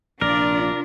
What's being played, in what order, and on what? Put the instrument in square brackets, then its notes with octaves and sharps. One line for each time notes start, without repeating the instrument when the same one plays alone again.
[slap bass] A#1 [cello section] C3 D4 F4 [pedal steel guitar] A#4 [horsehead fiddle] D5